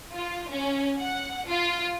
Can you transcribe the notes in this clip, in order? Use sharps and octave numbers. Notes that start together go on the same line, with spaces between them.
F4
C#4
F#5
F4